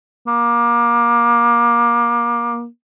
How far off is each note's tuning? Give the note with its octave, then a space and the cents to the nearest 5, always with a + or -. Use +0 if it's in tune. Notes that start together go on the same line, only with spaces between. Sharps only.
A#3 +25